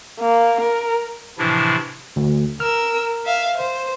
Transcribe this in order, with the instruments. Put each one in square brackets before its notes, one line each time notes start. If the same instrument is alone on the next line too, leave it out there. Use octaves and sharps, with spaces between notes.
[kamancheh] A#3
A#4
[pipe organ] A2 C3 E3 F3 D4 E4
[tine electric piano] D2
[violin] A#4 E6 [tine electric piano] F6
[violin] E5 F5
C5